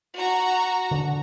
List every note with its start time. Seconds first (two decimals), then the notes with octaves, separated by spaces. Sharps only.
0.16 F#4 A#5
0.91 D3